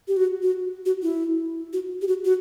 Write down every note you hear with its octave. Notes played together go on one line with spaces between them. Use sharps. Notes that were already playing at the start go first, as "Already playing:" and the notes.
G4
F#4
F#4
F#4
E4
F#4
G4
F#4
F#4